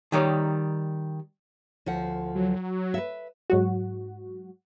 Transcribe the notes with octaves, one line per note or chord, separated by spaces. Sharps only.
D#3 G3 D#4 C#5
D2 F3 F#5
F#3
B4 E5
G#2 F#3 F#4